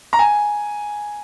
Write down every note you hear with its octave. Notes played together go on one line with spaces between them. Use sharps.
A#5
G#5